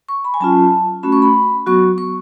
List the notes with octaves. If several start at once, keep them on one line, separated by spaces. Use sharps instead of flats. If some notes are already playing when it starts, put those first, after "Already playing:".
C#6
B5
G#5
F#3 C#4 F4 A5
A3 C#4 F#4 B5
C#6
B5
F#3 B3 F#4 C#6
C#6